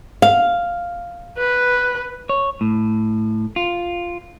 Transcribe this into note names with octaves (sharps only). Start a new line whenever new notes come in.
F5
B4
C#5
A2
F4